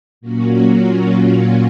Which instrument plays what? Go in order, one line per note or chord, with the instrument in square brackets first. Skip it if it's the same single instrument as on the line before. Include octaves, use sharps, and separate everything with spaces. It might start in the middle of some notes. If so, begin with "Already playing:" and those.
[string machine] A#2 F#3 A#3 C#4 F#4
F4
F#4